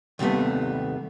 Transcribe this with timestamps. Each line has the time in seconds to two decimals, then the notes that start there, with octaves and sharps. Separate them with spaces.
0.19 D#2 C3 G3 A3 B3